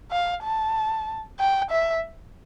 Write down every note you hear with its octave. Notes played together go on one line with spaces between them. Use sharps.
F5
A5
G5
E5